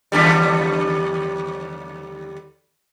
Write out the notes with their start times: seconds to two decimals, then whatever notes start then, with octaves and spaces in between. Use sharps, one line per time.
0.12 D#2 D3 G3